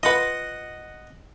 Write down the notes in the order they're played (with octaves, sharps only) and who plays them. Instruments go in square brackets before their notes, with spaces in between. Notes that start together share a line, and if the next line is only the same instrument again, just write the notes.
[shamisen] F4 B4 [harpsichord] D#5 F#5